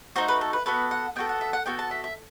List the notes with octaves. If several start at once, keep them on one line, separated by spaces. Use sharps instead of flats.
A3 D#4 F#4 C5
B4
A4
B4
B3 F#4 A4 B4
F#5
B3 F#4 A4 G5
F#5
E5
F#5
B3 F#4 A4 G5
A5
E5
E5